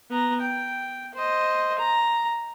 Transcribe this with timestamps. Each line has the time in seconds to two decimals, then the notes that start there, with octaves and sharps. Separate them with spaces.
0.10 B3 A#5
0.41 G5
1.14 C5 D#5
1.79 A#5